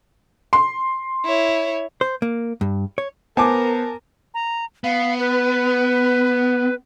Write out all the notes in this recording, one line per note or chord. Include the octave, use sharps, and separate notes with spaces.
C6
E4 C#5
C5
A#3
G2
C#5
B3 A#4 C5 G#5 A5 D6
A#5
B3 F5
B4